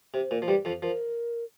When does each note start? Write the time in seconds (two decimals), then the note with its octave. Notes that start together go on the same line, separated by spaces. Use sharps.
0.14 C3 C5
0.31 A#2
0.42 F3
0.48 G2 G3
0.65 F2 F3
0.82 F3 A#4